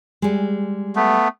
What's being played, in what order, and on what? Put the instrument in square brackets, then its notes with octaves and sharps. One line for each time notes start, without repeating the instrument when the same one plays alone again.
[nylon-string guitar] G3 G#3
[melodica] A3 B3